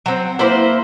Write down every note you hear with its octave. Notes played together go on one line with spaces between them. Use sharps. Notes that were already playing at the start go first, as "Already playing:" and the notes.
F#3 C4
A#3 E4 B4 C5